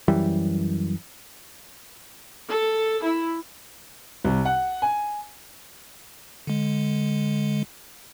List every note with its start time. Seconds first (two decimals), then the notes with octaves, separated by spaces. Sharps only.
0.08 F#2 E3 G3
2.51 A4
3.04 E4
4.25 C2
4.45 F#5
4.82 G#5
6.47 D3 G#3